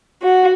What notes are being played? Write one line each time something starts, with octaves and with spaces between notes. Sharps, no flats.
F#4